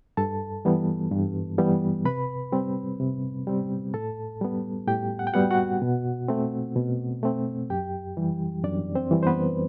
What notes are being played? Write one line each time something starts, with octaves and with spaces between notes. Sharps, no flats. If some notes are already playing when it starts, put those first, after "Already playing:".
G2 A4 A5
E3 G3 B3
G2
E3 G3 B3
C3 B4 B5
G3 C4
C3
G3 C4
A2 A4 A5
G3 B3
A2 G4 G5
F#5
G5
G3 B3 F#4 F#5
F#4 F#5
B2
A3 C4
B2
A3 C4
F#2 G4 G5
E3 G3
F#2 D4 D5
C4 C5
E3 G3
C5
B3 B4